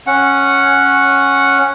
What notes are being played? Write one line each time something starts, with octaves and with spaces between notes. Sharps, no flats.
C#4 F#5